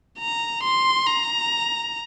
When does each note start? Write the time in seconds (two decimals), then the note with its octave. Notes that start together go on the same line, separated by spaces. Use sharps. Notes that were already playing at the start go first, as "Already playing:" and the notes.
0.19 A#5
0.64 C6
1.07 A#5